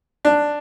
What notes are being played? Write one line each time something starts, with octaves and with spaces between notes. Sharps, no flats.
D4